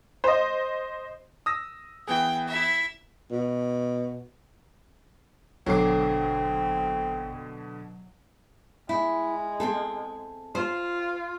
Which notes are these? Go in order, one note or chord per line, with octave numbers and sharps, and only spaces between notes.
C5 D#5
D#6 E6 A#6
E3 B3 G#4 G5
E4 E5
B2
G#1 B2 D3 F#3 C4 A4 D6 C7
G#3 E4
C4 G#4 A4
F4 C5